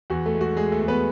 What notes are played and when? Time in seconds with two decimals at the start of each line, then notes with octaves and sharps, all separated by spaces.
0.10 E2 F#4
0.26 A3 A4
0.34 G#3
0.41 F#4
0.57 G#3 G#4
0.72 A3 A4
0.80 E2
0.88 B3 B4